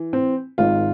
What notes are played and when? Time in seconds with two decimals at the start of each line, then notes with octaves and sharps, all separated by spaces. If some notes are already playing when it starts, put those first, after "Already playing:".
Already playing: E3
0.13 C4
0.58 G#1 G#2 D#3 F4